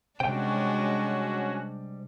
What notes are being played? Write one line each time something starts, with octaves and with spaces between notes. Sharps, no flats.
C3 G3 G#3 C#4 D4 F#4 C5 G5